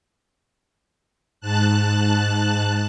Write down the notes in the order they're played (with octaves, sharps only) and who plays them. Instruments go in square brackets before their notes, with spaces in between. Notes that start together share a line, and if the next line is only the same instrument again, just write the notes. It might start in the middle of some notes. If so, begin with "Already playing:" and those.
[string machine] G#2 A5 F#6